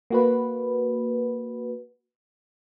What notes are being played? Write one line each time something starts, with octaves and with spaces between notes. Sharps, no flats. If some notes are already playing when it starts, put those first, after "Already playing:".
A#3 F#4 B4